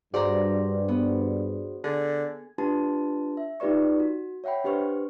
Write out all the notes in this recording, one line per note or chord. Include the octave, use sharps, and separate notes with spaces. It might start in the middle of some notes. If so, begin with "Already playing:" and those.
G2 F#4 G#4 C5 D5 A#5
B3
D3 G#4
D4 F4 G4 B4 A5 C6
E5
D#4 F4 G4 B4 D5 C#6
F#4
C#5 E5 F#5 G5 B5
D4 G4 B4 C5 C#6 F6